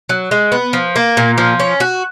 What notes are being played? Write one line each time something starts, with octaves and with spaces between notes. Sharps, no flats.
F#3
G#3
B3
F3
A#3
A#2
F3
C#4
F#4